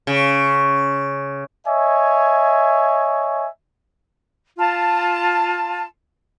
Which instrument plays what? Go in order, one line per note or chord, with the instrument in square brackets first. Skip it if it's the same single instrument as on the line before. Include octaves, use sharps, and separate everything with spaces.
[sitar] C#3
[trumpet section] C#5 D#5 E5 G#5
[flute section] F4 A5